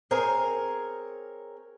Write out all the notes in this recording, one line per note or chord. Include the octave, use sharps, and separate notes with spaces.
C4 G#4 A#4 C#5